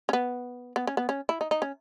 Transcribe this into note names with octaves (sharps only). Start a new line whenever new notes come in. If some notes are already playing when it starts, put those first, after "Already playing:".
C#4
B3
B3
C#4
B3
C#4
E4
D#4
D#4
C#4